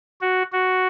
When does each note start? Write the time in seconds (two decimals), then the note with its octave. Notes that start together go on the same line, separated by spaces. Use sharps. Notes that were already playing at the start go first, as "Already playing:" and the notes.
0.21 F#4
0.52 F#4